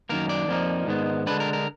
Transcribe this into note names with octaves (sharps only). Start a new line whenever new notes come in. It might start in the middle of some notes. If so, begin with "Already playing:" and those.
F#2 D#3 A#3 A#4
D5
F2 F3 A#3 D#4
G#2 D#3 G#3 B3
D3 G#3 D4 B4
A#4
A#4